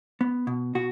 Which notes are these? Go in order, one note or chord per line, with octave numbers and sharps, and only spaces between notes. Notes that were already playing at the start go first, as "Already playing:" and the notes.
B3
B2
B2 F#4